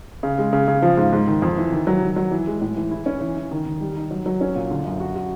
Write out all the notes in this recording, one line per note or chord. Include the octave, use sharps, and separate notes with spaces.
C#3
G#3
C#3
C#3
F3
G#2
G#2
D#3
F2
E3
D#3
F#3
D#3
F#3
E3
G#3
A2
E3
E4
C#4
E3
E3
D#3
D#3
G3
D#4
F#3
F#3
C#4
A#2
D3
F#2
F#4
F#4